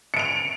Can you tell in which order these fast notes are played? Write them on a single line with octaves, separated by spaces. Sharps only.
C#7 D7 F7